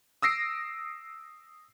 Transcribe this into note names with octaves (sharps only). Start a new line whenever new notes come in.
D#6 E6 A#6 C7 D7